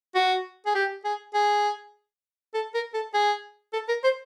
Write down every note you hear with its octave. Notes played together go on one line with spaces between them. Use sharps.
F#4
G#4
G4
G#4
G#4
A4
A#4
A4
G#4
A4
A#4
C5